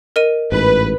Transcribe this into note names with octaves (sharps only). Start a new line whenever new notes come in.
A#4 D#5 D#7
A1 G#2 B4